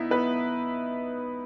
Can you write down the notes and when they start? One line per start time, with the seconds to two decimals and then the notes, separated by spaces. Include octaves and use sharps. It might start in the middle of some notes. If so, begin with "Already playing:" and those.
Already playing: B3 D#4 E4 E5
0.11 B3 B4